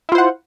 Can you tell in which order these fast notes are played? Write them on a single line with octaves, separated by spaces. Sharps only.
E4 F4 C5 F#5